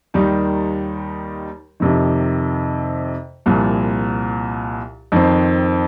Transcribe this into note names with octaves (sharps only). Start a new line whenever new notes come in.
D#2 D#3 G3 D#4
F2 C3 D#3
C2 A#2 F3
F2 D#3 C4